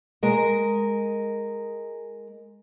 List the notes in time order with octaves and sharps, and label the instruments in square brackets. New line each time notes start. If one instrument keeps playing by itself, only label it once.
[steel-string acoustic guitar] G#3 A#4 D#5